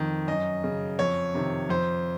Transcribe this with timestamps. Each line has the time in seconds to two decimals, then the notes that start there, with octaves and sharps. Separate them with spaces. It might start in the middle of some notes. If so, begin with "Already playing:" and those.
Already playing: F2 D#3
0.27 F#2 D#5
0.64 C#3
0.99 F2 C#5
1.34 C3 D#3
1.69 F2 C5